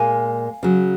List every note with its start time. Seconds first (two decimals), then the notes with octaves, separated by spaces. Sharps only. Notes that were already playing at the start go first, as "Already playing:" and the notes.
Already playing: A#2 G#3 F5 G#5
0.63 C#3 F#3